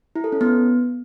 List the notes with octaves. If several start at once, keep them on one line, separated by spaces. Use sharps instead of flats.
E4
A4
C#4
B3